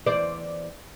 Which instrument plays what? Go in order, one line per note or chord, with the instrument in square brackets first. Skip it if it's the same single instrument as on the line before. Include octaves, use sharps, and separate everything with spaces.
[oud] E2 C5 D5